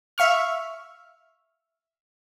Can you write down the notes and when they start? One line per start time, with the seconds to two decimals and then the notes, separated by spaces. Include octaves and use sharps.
0.18 E5 F5 C#6 F6